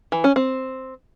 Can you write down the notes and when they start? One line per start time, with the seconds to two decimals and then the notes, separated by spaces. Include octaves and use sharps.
0.12 E3
0.24 C#4
0.36 C4